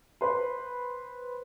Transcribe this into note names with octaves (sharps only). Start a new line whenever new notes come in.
B4 C5 C6